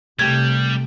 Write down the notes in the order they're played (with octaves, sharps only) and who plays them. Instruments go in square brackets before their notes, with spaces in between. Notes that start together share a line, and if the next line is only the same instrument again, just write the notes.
[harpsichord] C2 A3 G4 [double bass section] C3 [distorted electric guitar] G3 [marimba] G#6